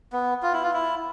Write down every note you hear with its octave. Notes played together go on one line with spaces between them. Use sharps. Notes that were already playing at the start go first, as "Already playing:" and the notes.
B3
F4
E4
F4
E4